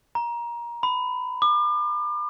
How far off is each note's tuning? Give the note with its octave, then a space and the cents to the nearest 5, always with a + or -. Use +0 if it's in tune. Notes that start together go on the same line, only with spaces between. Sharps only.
A#5 +20
B5 +25
D6 +40